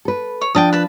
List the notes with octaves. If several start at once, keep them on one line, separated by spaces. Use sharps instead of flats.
A4 B4
C#5
F3 D4 G5 A5 D#6
B4 A5